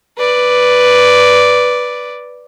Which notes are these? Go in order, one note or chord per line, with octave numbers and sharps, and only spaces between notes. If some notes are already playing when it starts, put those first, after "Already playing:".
B4 D5